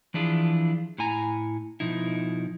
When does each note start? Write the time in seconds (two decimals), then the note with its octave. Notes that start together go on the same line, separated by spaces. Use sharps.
0.14 E3 F3 D4 E4 F4 G#4
0.98 A2 E4 G#5 A#5
1.80 B2 F3 D#4 E4